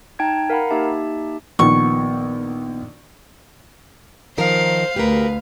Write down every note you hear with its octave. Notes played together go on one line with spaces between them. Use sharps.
D#4 G5 A5 A#5 G#6
A#4 F5 F#5 A#5 B5
A#3 D#4 G4 E5 A5
A#1 D#3 B3 A#4 F#5 C#6
D#3 F3 A#4 C5 F5
D2 G4 A#4 B4 F5